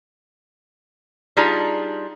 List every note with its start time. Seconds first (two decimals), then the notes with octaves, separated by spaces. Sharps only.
1.37 G3 D4 D#4 F4 G#4